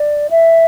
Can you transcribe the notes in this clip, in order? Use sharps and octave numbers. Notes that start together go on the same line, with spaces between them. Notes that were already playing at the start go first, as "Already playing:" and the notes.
Already playing: D5
E5